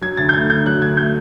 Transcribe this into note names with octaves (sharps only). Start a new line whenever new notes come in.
F#3 G#6
D2 A6
G6
A3 G#6
D3 G6
F#3 F#6
D2 G#6
A3 G6